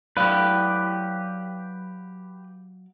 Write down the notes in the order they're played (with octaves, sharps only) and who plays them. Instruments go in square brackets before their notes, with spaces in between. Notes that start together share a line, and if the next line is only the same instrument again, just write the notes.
[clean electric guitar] F#3 D5 F5 [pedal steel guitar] G4 B4